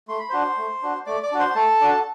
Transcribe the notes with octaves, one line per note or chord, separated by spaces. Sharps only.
A3 C6
B5
D4 F#4 C5 C6
A3
D4 F#4
A3 D5 D6
D5 D6
D4 F#4
C5 C6
A3 A4 A5
D4 F#4